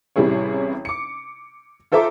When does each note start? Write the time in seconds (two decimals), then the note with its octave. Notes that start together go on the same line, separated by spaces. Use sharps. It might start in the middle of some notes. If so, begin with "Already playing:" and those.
0.16 A1 C3 G3 E4 G#4 C#5
0.85 D6 C#7
1.92 F4 A4 C5 E5 A#5 D6